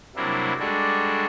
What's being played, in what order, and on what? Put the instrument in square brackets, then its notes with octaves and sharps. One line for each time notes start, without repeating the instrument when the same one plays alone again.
[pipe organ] C3 F#3 G3 A#3 D4 E4
G3 G#3 D4 F#4 A4